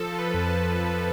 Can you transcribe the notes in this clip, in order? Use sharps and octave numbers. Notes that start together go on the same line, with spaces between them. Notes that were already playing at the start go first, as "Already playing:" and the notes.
Already playing: F3 A4
F3
B4
F2
A4
F2
F2